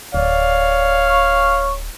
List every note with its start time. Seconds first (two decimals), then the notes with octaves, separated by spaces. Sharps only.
0.14 D1 C#5 D5 F5
1.08 C#6